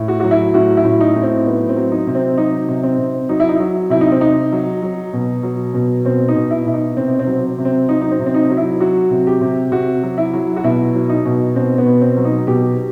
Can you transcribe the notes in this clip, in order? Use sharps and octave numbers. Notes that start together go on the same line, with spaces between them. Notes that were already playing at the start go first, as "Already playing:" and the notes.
Already playing: A2
F#4
F#3 F#4
E4
A2 F#4
E4
A2
D#4
A2
C4
F#3 B3
C4
F#3
D#4
C3
C4
F#3 D#4
C3
C4
C3
F#3 D#4
E4
D#4
F#3
C3 E4
D#4
C4
C3 D#4
F#3
F#3
B2
F#3
B2
B2 C4
D#4
B2
E4
B2 E4
D#4
C3 C4
C4
F#3
C3
C4
F#3 D#4
D#4
C4
C3
C4
D#4
F#3
E4
F#3 F#4
C3
G4
C3
C3 F#4
F#3
E4
F#3
F#4
B2 E4
F#3
D#4
B2
B2 C4
B3
B2
C4
F#3
D#4
B2 G4